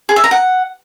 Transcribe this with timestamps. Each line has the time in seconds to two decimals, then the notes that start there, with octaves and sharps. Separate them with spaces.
0.09 G#4
0.16 E5
0.24 A#5
0.31 F#5